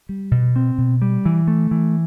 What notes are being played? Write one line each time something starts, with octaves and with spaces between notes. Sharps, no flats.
G3
B2
C4
B2
G3
E3
A3
E3